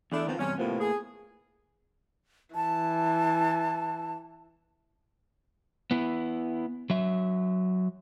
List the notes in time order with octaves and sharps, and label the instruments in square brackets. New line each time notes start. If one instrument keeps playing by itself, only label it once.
[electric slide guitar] E2 E4 [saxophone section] A3 D4
[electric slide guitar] D#3 B3 C4 [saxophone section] F3
[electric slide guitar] E2 G2 C3 [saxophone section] C#4
[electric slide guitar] A2 A#3 B3 [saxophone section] C3 F3
[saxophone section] G#4
[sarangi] E3 [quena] A5
[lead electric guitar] B3 E4
F#3 E5